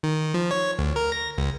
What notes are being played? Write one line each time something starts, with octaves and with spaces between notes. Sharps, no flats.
D#3
F3
C#5
D2
A#4
A#6
C#2